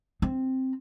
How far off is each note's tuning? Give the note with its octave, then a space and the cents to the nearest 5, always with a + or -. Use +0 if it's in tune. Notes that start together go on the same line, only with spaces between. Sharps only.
C4 +0